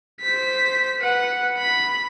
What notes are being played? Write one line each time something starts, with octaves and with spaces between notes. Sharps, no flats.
C5 B6
B4 F#5
B5